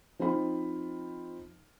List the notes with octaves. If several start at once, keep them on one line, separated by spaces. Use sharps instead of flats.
F3 C4 D#4 F4 B5